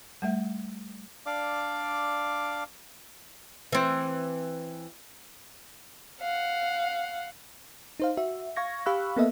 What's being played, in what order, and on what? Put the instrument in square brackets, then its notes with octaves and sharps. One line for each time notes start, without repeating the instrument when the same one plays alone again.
[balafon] G3 A3 E5
[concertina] D4 D5 F5 D6
[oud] E3 C4
[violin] F5 F#5
[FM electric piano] D#4 C5 F5
F#4 E5
F5 C#6 G#6 A#6
G4 F5 B5 C#6 E6 F#6
A#3 B3 A4 D#5 E5